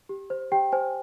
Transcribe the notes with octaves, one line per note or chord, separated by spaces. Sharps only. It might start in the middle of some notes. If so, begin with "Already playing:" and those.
G4
C5
G4 G5
C5 G#5